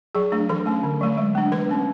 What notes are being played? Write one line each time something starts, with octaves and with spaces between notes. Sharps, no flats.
F#3 G#4
A3 D4
E3 A4
A3 C#4
D3
F#3 A3
G#3
B3 D4
E3 B4
A3 C#4